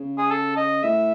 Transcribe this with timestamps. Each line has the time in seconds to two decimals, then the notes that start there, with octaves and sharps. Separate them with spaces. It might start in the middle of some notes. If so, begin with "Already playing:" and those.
Already playing: C#3
0.18 G#4
0.31 A4
0.57 D#5
0.83 A2 E5